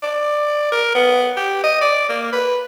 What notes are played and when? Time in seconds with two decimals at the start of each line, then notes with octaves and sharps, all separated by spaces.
0.02 D5
0.72 A#4
0.95 B3
1.37 G4
1.64 D#5
1.81 D5
2.09 A#3
2.33 B4